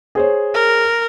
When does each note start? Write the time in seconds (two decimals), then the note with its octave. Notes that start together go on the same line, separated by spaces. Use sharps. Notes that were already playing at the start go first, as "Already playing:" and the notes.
0.15 G#4 C5 C#5
0.54 A#4